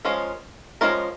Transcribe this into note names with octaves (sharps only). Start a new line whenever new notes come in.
F3 G#3 C#4 F4 A#4
F3 G#3 C#4 F4 A#4